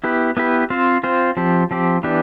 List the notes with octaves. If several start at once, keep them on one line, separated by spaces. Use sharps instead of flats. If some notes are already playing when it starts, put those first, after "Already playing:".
B3 E4 G4 B4
B3 E4 G4 B4
C4 F4 C5
C4 F4 C5
F3 C4 G4
F3 C4 G4
E3 B3 D4 G4